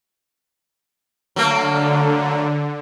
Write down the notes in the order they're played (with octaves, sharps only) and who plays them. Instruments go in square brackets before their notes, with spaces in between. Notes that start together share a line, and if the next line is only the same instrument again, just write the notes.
[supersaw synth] D3 [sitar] F#3 A3 A#3